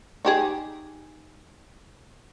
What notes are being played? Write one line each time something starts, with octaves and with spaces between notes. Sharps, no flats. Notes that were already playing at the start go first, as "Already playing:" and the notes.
D#4 G4 G#4